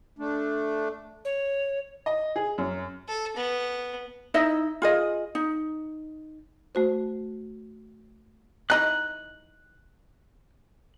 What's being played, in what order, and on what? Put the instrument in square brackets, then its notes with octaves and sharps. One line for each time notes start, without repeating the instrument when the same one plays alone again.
[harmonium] A3 D4
[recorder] C#5
[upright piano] D#5
G#4
F#2
[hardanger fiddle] A4
B3
[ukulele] D#4 E4 D#5 E5
F4 G#4 D#5
D#4
[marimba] A3 F#4 C5
[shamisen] E3 D#4 D#5 [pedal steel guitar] F#6